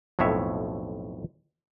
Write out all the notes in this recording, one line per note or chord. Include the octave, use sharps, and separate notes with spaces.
B1 F2 A2 C#5 E5